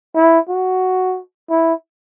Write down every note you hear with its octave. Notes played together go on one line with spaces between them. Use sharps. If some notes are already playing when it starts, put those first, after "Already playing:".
E4
F#4
E4